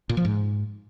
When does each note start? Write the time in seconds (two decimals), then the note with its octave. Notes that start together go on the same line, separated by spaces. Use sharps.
0.09 A#2
0.17 F3
0.25 G#2